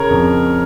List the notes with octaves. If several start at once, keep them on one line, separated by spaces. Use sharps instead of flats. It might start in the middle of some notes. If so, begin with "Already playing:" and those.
Already playing: C#3 A#4 C#5
F2